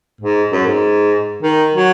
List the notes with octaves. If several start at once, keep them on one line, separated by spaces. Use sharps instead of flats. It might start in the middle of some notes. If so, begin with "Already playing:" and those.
G#2
F#2
G#2
D#3
F#3